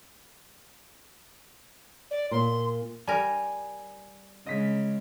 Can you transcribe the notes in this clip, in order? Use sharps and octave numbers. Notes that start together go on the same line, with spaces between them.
D5
A#2 C6
G3 A#4 G#5
C#3 G#3 D#5 B6